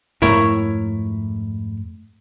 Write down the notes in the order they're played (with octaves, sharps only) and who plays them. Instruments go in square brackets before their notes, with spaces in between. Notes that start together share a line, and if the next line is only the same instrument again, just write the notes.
[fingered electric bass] F2 G#2 A3 [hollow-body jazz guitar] E4 A#4 C#5